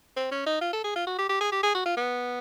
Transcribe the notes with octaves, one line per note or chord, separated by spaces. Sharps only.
C4
C#4
D#4
F4
A4
G#4
F4
F#4
G4
G4
G#4
G4
G#4
F#4
F4
B3